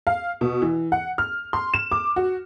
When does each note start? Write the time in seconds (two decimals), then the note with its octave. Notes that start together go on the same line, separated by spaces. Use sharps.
0.07 F5
0.41 B2
0.62 E3
0.92 F#5
1.18 F6
1.53 C6
1.74 E7
1.92 D6
2.16 F#4